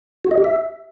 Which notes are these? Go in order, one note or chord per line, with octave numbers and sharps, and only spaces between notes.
F#4
D#5
G4
E5